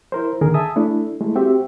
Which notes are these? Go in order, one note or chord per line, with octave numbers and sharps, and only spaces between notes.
E4 A#4 C5
D#2 A#2 D3 D#3 G#4 A#4
E5 G#5 A5 D#6
A3 D4 E4
G#3 A3 E4
C4 F#4 G4 E5